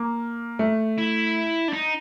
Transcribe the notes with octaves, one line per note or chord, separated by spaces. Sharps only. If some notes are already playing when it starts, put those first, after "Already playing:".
Already playing: A#3
A3
E4
D4
D#4